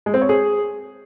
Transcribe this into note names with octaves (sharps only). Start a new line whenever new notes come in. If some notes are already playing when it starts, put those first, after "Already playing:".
G#3
C4
C#5
G#4